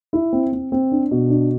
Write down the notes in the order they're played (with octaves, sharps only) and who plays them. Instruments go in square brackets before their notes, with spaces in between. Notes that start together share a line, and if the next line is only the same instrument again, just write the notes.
[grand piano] E4
C4
C4
C4
D4
B2
D4